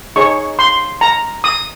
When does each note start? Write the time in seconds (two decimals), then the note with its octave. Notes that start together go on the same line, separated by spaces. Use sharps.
0.16 D#4 G#4 C#5 C#6
0.59 C6
1.01 A#5
1.44 D#6